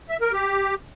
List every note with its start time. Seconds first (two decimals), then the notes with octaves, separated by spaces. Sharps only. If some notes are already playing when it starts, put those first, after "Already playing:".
0.09 E5
0.21 A#4
0.32 G4